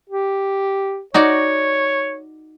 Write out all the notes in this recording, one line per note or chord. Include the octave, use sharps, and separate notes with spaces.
G4
D#4 F#4 C#5 D5